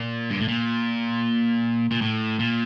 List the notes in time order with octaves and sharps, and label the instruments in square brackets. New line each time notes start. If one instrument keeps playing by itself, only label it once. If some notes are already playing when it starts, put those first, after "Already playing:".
Already playing: [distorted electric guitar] A#2
G2
A2
A#2
A#2
A2
A#2